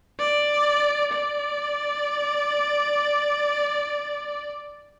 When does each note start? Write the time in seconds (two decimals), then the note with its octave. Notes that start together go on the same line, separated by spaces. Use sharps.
0.19 D5
1.12 D5